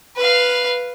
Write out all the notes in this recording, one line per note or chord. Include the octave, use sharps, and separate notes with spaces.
B4 F5